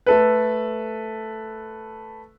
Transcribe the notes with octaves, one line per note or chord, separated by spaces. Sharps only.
A3 A4 B4